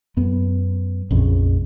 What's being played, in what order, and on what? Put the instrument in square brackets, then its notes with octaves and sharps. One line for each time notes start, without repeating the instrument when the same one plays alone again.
[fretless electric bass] F#2 B3
A#1 F2 C#3